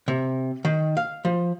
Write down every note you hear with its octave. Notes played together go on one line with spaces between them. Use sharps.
C3
D#3
F5
F3